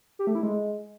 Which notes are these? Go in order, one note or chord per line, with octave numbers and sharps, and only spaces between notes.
G4
A3
E4
G#3